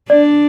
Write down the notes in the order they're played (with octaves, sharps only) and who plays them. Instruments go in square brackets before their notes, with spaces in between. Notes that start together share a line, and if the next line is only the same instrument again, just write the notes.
[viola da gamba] D4 [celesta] D5